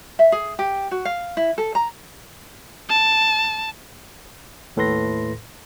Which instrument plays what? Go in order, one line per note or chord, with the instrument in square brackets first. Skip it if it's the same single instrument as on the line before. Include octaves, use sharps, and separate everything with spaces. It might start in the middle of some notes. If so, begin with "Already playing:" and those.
[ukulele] E5
G#4
G4
F#4
F5
E4
A4
A#5
[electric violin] A5
[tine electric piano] D#2 A2 A4 B4 C6 A#6